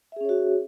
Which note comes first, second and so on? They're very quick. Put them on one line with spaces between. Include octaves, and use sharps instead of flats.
E5 G#4 C#4 C#5 F#4